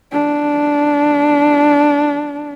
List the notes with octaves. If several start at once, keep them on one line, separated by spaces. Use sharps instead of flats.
D4